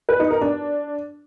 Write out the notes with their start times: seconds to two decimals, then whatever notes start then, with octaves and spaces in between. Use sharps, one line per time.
0.09 B4
0.20 D#4
0.30 A#4
0.41 D4